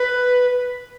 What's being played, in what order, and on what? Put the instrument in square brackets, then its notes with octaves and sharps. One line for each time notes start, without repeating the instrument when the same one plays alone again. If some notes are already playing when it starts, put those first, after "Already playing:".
Already playing: [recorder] B4